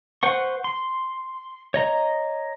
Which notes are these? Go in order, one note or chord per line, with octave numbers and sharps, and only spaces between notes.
B4 C5 F#5 C#6
C6
C#5 D#5 A#5